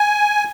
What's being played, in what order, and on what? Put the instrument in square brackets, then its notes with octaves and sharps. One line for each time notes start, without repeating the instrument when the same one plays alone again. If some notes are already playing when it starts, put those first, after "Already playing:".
Already playing: [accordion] G#5